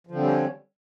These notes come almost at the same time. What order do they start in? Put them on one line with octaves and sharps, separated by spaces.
F3 D3 C4 G3 C#4